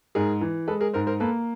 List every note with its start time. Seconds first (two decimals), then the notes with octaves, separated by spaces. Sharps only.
0.15 G#2 G#4 A#4
0.41 E3
0.68 G#3 A4 B4
0.81 G#4 A#4
0.93 G#2 A#4 C5
1.07 A#4 C5
1.20 A#3 A4 B4